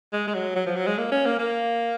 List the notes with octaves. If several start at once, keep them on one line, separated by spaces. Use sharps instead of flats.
G#3
G#3
F#3
F#3
F3
F#3
G#3
A#3
C#4
A#3
A#3